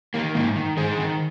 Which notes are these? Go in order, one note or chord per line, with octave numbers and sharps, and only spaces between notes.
D#3 A#3
G#2 A#3 D#4
D#3
G#2 G#4 C5
D#3